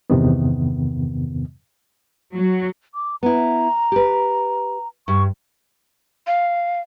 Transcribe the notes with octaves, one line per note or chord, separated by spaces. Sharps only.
E2 G2 C3 D#3 B3
F#3
D6
B3 E4 A#5
G4 B4
G2 C#6
F5